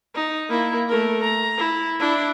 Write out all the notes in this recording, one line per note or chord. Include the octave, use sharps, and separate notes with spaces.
D#4
A#3 E4
A3 A#4
A#5
E4
D4 E4